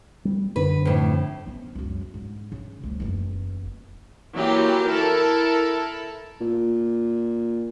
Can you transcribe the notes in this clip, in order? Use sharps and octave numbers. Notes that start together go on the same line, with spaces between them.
G3
F#2 D3 D4 B4
F2 A2
B3 C#4
C#2 F#2
G#2
C#3
D2 G3
F#1 E2
E3 F#3 A#3 G4
E4 A4 A#4
A#2